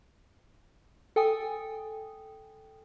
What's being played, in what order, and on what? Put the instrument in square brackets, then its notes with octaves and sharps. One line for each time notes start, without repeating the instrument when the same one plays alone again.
[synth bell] A4 G5 G#5 D#6